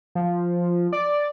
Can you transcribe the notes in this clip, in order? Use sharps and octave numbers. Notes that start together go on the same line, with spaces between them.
F3
D5